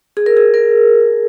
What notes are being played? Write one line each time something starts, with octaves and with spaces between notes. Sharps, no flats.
G#4
A#4
G#4
A#4